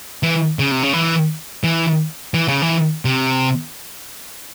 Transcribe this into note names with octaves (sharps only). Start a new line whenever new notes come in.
E3
C#3
C3
C#3
E3
E3
E3
C#3
E3
C3